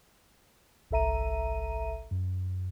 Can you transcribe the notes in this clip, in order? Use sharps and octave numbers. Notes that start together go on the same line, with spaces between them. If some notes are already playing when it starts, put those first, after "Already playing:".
G1 C2 A4 E5 A#5 D#7
F#2